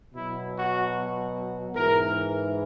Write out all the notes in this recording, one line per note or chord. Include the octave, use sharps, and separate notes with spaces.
B2 F#3 E4
F#4
G#2 E3 A#4